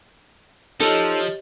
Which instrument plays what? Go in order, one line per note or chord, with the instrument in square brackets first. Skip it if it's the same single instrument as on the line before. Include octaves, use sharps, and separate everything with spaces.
[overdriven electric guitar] F3 [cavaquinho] D#4 A4 [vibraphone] G4 C#5 D#5